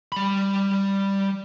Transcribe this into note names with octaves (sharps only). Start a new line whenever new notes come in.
G3 B5